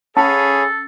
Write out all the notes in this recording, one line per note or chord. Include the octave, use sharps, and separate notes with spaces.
C#4 G#4 A4 C#5 F5 A5 B5